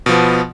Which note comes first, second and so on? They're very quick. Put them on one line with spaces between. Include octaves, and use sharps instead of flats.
B2 F3 B3